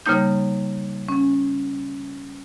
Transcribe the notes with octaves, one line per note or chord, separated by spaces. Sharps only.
C#3 G3 A#3 D#4 G6
C#4